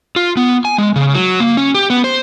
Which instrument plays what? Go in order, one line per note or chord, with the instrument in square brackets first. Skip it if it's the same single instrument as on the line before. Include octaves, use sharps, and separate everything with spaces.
[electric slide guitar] F4
B3
G#5
G#3
C#3
F#3
A#3
C#4
G4
B3
C5